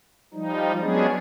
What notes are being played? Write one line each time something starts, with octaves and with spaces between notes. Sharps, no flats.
F3 G3 D#4
F#3 G#3 B3 C#4 D4 G#4